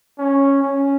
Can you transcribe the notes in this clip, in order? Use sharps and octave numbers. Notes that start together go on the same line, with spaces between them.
C#4
C#4